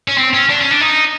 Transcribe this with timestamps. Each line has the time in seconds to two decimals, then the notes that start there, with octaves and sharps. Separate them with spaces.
0.08 C#4
0.17 C4
0.34 C#4
0.49 D4
0.61 C#4
0.71 D4
0.81 D#4